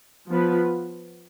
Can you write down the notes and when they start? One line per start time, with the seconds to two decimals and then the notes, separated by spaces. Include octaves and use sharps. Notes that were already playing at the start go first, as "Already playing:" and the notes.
0.29 F3 B3 F4 B4